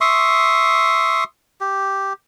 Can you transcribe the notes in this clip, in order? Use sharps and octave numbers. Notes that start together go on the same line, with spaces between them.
E5 C6 C#6 D#6
G4